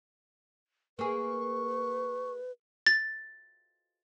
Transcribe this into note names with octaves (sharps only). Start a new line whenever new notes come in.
A#3 G#4 B4 C#6
A6